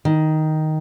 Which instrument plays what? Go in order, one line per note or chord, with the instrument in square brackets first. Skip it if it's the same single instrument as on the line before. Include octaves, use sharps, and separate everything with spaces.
[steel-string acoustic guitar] D#3